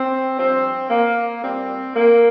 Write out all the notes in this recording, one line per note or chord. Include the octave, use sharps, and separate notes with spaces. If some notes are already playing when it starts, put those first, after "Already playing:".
Already playing: C4
G2 F3 C4
A#3
A#2 G3 C4
A#3